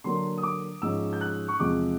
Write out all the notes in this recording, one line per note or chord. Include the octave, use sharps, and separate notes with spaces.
D3 F#3 A#3 D4 C6
D#6
D6
G#2 F3 G#3 C#4 E6
G6
F#6
C#6
E2 C3 F3 G#3 D6